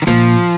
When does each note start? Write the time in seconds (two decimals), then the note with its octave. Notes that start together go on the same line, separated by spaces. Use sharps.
0.02 D#3
0.07 A#2 F3